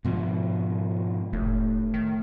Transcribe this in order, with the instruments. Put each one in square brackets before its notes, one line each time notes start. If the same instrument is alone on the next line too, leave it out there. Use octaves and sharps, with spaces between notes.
[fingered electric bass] G#2 B2 F3
[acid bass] F1 [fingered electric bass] A2
[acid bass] D#3